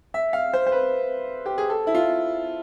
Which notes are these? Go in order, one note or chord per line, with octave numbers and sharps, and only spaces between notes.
E5
F5
C5
C5
B4
G4
G#4
A4
E4
F4